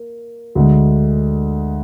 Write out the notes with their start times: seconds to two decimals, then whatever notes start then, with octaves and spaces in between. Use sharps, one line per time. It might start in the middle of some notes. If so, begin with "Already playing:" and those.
Already playing: A#3
0.55 D2 D3 G#3